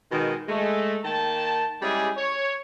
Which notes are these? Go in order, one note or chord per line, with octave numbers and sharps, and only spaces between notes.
B2 D#3 G#3
G#3 A3
D#3 A#3 G5 A5
G3 G#3 C#4 E4 G4 G#4
C#5